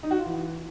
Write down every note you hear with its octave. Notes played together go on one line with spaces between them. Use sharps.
D#4
F#4
F4
E3